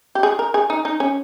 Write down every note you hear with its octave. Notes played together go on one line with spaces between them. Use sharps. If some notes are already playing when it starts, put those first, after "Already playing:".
G4
G#4
A#4
G#4
D#4
D#4
C#4